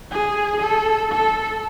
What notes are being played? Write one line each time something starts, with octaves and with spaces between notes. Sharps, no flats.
G#4
A4
A4